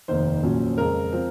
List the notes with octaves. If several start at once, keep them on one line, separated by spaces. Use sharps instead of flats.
F1 D#2 D#3 C5
A#1 A#2 F#3 C#4
F2 C#3 G#3 C4 A#4
F3 C4